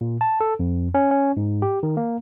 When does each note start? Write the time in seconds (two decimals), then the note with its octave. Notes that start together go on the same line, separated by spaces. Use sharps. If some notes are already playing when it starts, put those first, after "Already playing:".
0.01 A#2
0.21 A5
0.41 A4
0.59 F2
0.94 C#4
1.11 C#4
1.37 G#2
1.62 G4
1.83 D#3
1.97 A#3